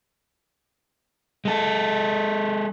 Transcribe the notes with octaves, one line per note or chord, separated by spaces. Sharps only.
G#3 A4